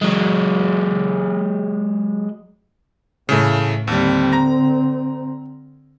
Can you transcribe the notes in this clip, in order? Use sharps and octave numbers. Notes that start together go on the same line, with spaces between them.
F#3 G#3
A2 C#3 E3 A3
D#2 D3 G3 C4
A#5 A#6